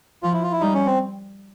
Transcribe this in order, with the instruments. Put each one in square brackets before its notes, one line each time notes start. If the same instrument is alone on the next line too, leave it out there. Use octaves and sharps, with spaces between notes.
[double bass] F3 [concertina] F4
[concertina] E4
F4
E4
[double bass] G3 [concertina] D#4
[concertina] C#4
C4